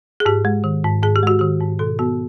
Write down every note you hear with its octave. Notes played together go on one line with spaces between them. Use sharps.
G#4
G#2 G4
G#3
D#3
G#2
G#2 G#4
G4
G#3 F#4
D#3 G4
G#2
B2 A4
B3 F#4